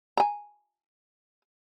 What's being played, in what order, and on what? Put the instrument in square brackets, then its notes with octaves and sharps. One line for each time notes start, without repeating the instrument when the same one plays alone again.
[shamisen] G#5 A#5